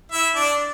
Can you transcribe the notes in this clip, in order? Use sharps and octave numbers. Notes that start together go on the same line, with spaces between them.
E4 E5
D4 D5